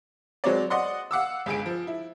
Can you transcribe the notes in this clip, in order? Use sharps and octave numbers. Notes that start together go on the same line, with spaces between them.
F#3 G#3 C4 C#5 D5
D5 D#5 F#5 C6
F5 F#5 D6 E6
G1 C#2 G#4 D7
F3
E4